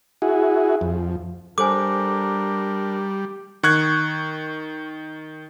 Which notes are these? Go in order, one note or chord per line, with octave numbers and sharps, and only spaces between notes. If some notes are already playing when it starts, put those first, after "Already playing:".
E4 F#4 G#4
F2
G3 D4 A4 A#4 C5 G#5 D6
D#3 C#6 F#6 G#6